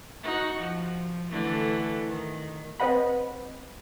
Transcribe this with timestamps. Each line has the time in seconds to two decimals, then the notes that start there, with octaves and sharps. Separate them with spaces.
0.23 D#4 F#4
0.60 F3
1.31 D3 E3 A3
2.08 D#3
2.80 C4 B4 C5 D#5 F#5 B5